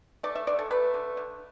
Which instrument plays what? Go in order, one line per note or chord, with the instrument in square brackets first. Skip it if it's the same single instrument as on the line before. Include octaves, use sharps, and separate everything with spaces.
[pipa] A3 D5
E5
D3 D5
A4
A3 B4
D3
D3